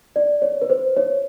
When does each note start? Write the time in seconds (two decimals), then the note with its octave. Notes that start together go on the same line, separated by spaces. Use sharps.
0.16 D5
0.42 C#5
0.62 B4
0.70 C5
0.97 C#5